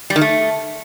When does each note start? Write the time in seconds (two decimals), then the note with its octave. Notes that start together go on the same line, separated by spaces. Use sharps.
0.10 G3
0.16 D#3
0.21 A3